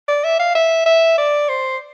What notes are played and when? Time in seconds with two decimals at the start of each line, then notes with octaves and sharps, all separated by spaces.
0.08 D5
0.24 E5
0.39 F5
0.55 E5
0.86 E5
1.18 D5
1.49 C5